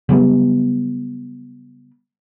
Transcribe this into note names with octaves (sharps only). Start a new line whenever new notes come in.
C#3 F#3 G3 B3